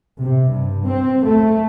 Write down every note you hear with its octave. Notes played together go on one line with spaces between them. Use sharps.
C3
G2
C4
A3